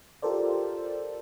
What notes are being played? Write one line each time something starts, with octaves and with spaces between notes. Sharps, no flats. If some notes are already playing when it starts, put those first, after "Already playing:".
F4 G4 A4 A#4 C5 D5